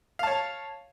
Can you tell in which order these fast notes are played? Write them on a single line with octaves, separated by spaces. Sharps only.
F5 A5 C#5